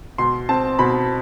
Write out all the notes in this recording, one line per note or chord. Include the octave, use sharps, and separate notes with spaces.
B2 C6
C4 A5
B2 B5